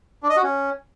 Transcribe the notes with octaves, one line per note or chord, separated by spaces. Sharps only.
D4
D#5
F#4
C#4